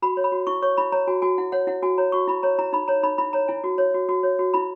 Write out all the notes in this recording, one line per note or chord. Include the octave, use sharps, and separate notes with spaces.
F#4 B5
C#5
B5
F#4
E4 C#6
C#5 C#6
E4 B5
C#5 A#5
F#4 G#5
F#4 G#5
E4 F#5
C#5 F#5
E4 F#5
F#4 G#5
C#5 A#5
F#4 C#6
E4 B5
C#5 A#5
E4 A#5
D#4 B5
C#5 A#5
D#4 B5
E4 B5
C#5 A#5
E4 G#5
F#4
C#5
F#4
F#4
C#5
F#4
E4 B5